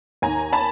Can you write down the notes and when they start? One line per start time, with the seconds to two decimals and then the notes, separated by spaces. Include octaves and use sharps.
0.22 D#2 D#3 G#5 A#5
0.53 A5 B5